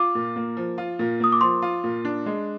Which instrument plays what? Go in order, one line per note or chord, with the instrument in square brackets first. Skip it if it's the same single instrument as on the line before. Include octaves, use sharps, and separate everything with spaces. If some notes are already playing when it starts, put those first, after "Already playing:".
Already playing: [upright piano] F4 [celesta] D6
[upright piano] A#2
A#3
F3
F4
A#2
[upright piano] A#3 [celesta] D#6
[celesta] D6
[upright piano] F3 [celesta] C6
[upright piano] F4
A#2
D4
G#3